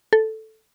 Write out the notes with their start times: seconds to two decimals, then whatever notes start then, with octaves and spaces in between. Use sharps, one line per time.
0.13 A4